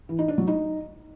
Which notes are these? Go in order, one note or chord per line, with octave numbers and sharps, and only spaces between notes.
E3
D#4
D4
F#3
D#4